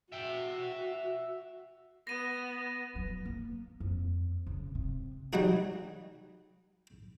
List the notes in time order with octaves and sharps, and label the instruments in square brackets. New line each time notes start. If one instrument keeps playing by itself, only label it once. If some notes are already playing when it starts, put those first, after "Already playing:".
[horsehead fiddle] F#4 [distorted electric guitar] E5 G5
[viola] B3 [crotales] A#6 D#7
[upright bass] F#3
A#3
F2
C#3
C3
[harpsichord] F#3 G3 D#4 F#4 G#4